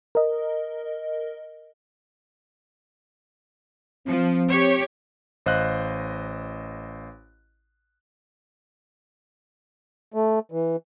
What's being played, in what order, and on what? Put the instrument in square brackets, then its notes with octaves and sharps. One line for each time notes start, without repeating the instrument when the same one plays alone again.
[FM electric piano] A#4 D#5
[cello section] F3 [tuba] C4
[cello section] G4 C#5
[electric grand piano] A1 C5 D#5 F5 F#6
[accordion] A3
E3